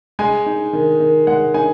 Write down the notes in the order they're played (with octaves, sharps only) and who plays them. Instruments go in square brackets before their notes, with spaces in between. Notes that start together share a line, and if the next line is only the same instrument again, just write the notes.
[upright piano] G#3 G#5
D#4
D#3
D#3
G#3 F#5
D#4 G#5